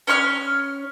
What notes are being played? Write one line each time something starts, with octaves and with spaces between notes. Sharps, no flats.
C#4 C#5 C6 F6